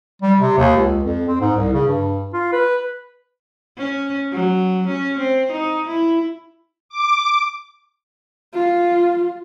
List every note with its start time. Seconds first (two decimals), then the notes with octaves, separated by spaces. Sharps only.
0.22 G3
0.40 C3
0.58 D#2
0.77 C#2
1.03 F2
1.28 C4
1.41 G#2
1.56 C2
1.73 C#3
1.88 G2
2.34 F4
2.53 B4
3.78 C#4
4.32 F#3
4.87 C#4
5.19 C4
5.52 D#4
5.87 E4
6.89 D6
8.53 F4